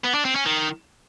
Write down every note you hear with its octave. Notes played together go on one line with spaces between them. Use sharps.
B3
D4
C4
C#4
D#3